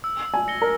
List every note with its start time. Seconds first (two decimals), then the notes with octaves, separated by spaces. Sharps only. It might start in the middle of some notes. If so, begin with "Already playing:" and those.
0.04 E6
0.34 G#5
0.48 A#6 C#7 G7
0.62 A#4